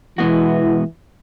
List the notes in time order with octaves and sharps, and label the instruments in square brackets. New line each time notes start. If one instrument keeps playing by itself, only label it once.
[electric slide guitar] B2 G#3 B3 F#4 [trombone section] E3